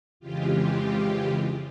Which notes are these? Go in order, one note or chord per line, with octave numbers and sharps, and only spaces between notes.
F2 C#3 E3 G#3 F4 G4
F4 G4